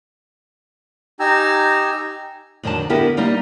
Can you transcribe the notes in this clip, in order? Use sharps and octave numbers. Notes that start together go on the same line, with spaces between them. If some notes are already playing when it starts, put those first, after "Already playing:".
D#4 G4 G5 G#5 A#5 E6
F2 D3 D#3 F#3 A5
D3 B3 E4 G4 A#4 B4
G3 A#3 B3 D#4 G4